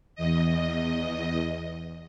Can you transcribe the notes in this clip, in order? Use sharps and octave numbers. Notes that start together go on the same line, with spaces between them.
E2 D#5